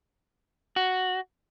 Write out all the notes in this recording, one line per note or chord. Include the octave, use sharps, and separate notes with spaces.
F#4